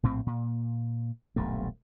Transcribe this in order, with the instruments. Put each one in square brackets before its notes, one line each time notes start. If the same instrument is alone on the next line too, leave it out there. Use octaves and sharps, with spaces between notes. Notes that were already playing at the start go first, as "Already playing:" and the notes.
[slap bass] A#1 A2 C4
A#2
D#1 B1 G2 A3